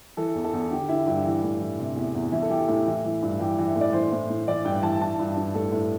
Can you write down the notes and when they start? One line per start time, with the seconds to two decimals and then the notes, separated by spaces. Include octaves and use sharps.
0.17 E3 A4
0.35 E2
0.44 A4
0.53 E2
0.71 D3 G4
0.89 D3 E4
1.06 G2 G4
1.25 E3
1.43 A2
1.60 E3
1.79 C3
1.96 E2
2.15 E2
2.32 E3 E4
2.42 A4
2.50 E3 G4
2.68 A2 G4
2.87 E3 E4
3.04 E3
3.22 G2
3.39 E3 G4
3.58 E3
3.67 E5
3.76 A2
3.81 D5
3.93 E3 C5
4.12 A2
4.29 A2
4.48 E3 D5
4.65 G2 G5
4.83 E3 A5
5.00 E3 A5
5.19 G2
5.36 G2
5.55 A2 A4
5.72 A2